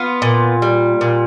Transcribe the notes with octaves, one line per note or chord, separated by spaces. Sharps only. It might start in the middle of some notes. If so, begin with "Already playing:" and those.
Already playing: B3 F4
A#2
G3
A#2